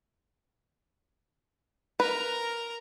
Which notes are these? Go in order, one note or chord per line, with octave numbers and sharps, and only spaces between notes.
A#4 B4 A#5